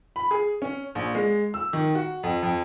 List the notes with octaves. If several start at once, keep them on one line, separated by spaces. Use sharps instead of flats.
B5
G#4
C#4
A#1
G#3
E6
D#3
F#4
F2
F2